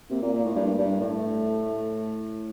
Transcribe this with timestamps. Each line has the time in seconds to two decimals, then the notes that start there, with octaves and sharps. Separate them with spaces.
0.10 C3 A#3
0.22 A#2
0.33 A#2
0.44 A2
0.56 G2
0.78 G2
1.00 A2 A3